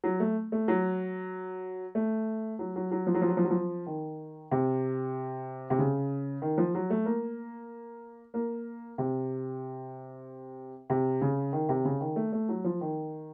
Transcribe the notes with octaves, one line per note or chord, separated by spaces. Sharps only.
F#3
A3
A3
F#3
A3
F#3
F#3
F#3
F3
F#3
F3
F#3
F3
F#3
F3
D#3
C3
C3
C#3
D#3
F3
F#3
A3
A#3
A#3
C3
C3
C#3
D#3
C3
C#3
D#3
A3
A3
F#3
F3
D#3